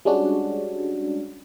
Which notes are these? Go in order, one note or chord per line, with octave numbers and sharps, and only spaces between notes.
G3 G#3 C#4 D4 F#4